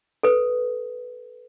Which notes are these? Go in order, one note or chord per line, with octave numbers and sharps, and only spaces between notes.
A4 B4